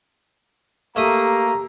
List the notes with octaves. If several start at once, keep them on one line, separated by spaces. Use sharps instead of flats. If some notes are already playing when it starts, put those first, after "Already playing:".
A3 A#3 G4 E5 A#5 D#6